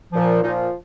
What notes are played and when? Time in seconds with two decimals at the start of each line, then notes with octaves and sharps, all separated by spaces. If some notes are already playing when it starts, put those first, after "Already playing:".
0.13 A#2 F3
0.43 A#2 F3 D#4